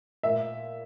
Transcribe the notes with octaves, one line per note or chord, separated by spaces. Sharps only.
A#2 E5